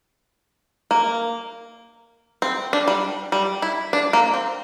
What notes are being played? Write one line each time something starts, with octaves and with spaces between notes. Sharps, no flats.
A#3
C4
D4
G3
G3
E4
D4
A#3
C4